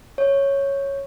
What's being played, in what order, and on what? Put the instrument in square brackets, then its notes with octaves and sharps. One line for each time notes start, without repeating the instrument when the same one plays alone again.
[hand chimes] C#5